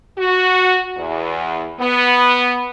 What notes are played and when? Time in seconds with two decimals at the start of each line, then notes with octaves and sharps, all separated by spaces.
0.18 F#4
0.97 E2
1.80 B3